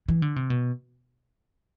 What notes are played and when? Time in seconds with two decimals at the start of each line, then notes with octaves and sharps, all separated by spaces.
0.08 E3
0.22 D3
0.36 C3
0.50 B2